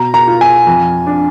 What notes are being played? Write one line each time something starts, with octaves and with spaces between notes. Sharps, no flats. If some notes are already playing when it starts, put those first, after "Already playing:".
Already playing: B2 A#5
A#5
F4
G#5
F2
D4